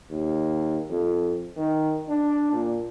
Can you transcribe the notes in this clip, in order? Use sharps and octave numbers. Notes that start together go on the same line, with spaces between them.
D#2
F2
D#3
D4
A#2